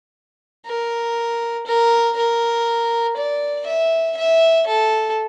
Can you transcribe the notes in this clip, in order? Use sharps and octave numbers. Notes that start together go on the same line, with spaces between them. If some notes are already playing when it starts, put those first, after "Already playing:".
A#4
A#4
A#4
D5
E5
E5
A4